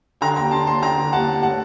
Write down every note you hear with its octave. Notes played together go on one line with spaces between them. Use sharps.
D3 G5 A#5
D#2 G5 A#5
D3 A5 C6
D#2 A5 C6
D3 G5 A#5
D3
D#2 F#5 A5
D#2
A2 F#5 A5